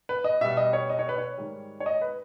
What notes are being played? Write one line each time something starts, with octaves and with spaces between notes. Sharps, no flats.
B4
D#5
B2 G3 E5
D#5
C#5
D#5
C#5
B4
C#5
G#2 D#3 G3
C#5
D#5
B4